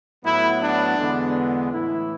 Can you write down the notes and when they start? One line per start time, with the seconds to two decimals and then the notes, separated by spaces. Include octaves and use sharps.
0.24 A2 F#3 B3 E4
0.61 D4
0.98 E2 D3 G#3 B3
1.71 A2 E3 A3 E4